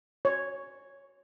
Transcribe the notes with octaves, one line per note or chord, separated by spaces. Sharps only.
C#5